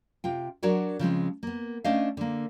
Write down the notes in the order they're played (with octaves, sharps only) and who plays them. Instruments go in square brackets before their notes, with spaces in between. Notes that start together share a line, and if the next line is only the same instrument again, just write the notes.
[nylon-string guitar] C3 F4 G5
F#3 D4 F#4 A#4 C#5 D5
C#3 F3 G#3 C4
A#3 B3
A3 C#4 D4 C5 D#5 F5
D3 A#3